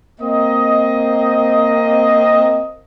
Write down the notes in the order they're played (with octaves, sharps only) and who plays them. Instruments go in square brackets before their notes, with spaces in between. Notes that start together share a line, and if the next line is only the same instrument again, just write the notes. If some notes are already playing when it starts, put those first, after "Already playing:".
[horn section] A#3 C4 D#5